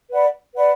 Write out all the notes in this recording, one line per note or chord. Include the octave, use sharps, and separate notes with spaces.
B4 D5 F#5 B5
B4 D5 F#5 B5